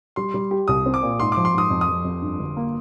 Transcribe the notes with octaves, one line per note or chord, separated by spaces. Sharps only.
G3 C6
G3
G4
C2 D#6
C4
D6
A#2
G#2 C6
D6
F3
C6
G#2 D#6
F2
D#6
F2
F2
G2
G1
A#3